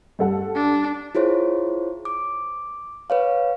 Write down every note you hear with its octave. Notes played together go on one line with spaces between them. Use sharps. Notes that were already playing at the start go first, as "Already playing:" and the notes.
G2 A4 F#5
D4
E4 F4 G#4 C5 C#5
D6
B4 C#5 F5